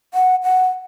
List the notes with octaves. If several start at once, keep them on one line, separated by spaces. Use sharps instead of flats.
F#5
F#5